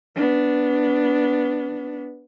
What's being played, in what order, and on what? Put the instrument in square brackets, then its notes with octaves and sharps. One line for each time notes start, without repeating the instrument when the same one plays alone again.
[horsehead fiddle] B3 D4